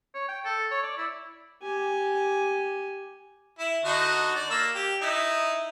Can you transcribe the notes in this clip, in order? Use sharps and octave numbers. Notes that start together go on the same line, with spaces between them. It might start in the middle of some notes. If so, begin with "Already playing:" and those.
C#5
G5
A4
C#5
D5
E4
G4 G#5
E4
D3 D#4 F#4
D5
A#3 E6
G4
D#4 E4